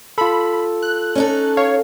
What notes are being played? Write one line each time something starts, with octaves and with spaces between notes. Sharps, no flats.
F4 A4 B5
F#6
C#4 D#4 A4
C#5 F5